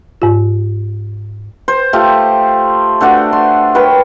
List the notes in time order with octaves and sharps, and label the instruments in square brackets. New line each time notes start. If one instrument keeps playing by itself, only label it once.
[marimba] G#2 F4
[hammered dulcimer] C5
A3 F4 G4
A3 D4 F#4 D5
C6
A#4 B4 C#5 G5